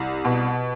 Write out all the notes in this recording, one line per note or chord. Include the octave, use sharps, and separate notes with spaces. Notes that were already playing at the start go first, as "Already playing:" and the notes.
Already playing: C2
B2